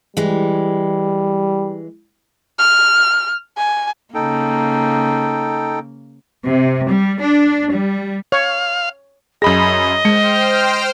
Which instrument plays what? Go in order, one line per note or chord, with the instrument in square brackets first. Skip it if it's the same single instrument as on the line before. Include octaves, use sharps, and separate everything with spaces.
[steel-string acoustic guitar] E3 G#3 [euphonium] G3
[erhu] F6
G#5
[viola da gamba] C#3 A#3 [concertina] D#4 A4 G5
[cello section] C3
G3
D4
G3
[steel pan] C#5 [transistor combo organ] F5
[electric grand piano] F#2 B5 A#6 [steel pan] G#4 [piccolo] D#5
[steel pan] G#3 [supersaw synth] C5 G5 F6 [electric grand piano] C#7